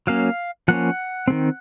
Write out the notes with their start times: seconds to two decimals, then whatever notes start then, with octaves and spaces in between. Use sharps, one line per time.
0.07 F#3 A#3 C#4 F5
0.68 F3 A#3 C#4 F#5
1.28 D#3 G#3 C4